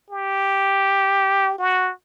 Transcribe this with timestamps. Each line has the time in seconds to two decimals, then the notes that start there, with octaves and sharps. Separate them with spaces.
0.10 G4
1.58 F#4